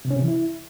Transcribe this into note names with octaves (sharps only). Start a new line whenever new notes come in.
C3
C#4
C3
E3
E4